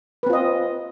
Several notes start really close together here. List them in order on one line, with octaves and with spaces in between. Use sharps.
B4 C4 F4 D#5